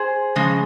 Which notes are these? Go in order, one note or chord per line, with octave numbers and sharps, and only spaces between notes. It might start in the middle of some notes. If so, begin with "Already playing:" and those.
Already playing: G#4 C5
C#3 F3 G#3